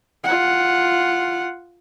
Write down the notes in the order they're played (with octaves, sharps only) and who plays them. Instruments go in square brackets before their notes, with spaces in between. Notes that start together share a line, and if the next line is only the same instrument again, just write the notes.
[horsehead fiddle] F4 F#5